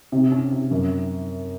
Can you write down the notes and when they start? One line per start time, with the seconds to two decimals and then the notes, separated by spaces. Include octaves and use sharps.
0.12 C3
0.31 C#4
0.51 C3
0.71 F#2